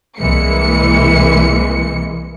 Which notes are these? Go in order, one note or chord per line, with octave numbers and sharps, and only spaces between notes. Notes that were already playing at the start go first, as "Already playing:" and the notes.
C2 E3 G#3 A#3 C#7